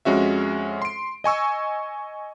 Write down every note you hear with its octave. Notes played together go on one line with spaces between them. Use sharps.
F2 G#3 C#4 F#4 E5
C6 D7
D#5 G#5 C#6 E6